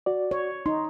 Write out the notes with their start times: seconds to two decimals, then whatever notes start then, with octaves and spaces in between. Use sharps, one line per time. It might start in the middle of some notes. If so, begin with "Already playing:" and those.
0.06 F#4 D5
0.31 C#5
0.66 D#4 C6